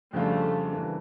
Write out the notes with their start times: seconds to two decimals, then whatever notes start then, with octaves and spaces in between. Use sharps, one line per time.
0.13 F2 C#3 G3 A3 D4 F4
0.73 C#3 E3 G3 A#3 D4